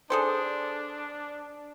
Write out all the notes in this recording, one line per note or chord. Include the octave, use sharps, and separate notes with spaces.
D4 G#4 A4 C5